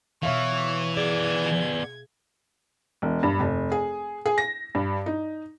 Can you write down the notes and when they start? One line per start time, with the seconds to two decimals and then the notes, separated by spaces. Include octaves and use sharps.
0.23 B2 E3 C#5 E5 F5
0.97 B3 G#4 D5 G#6
3.02 E1
3.23 G2
3.39 F1
3.72 G#4
4.26 G#4
4.38 A#6
4.75 G2
5.06 D#4